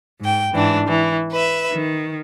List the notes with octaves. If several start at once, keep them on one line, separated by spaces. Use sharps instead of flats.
G#2 G5
G#2 E3 D4
E3
B4 E5
D#3